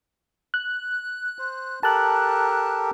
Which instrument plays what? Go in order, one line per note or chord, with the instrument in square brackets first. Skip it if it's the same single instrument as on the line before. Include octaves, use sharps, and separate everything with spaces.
[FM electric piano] F#6
[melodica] C5
[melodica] G4 A4 A#4 [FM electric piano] A5 F#6